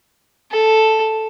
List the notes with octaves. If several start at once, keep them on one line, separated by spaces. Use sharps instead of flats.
A4